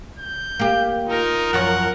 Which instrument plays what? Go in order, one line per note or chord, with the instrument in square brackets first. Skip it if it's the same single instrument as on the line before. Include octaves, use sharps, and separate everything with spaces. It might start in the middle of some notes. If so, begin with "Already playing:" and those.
[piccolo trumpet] G6
[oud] A#3 G4
[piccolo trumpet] D#4 [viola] F4 A#4
[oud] F#2 F3 C#5 [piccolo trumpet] F#5